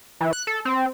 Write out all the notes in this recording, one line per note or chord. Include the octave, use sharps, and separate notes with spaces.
E3
F#6
A4
C4